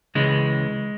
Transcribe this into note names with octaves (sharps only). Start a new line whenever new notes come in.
C#2 C#3 E3 G#3